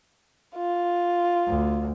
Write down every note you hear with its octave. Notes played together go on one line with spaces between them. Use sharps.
F4
D2